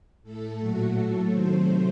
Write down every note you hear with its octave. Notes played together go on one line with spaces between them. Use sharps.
A2 A3 A4
A#2 F#3 A3 F#4
A2 F#3 A3 A4
C3 D#3 F#3 A3 C5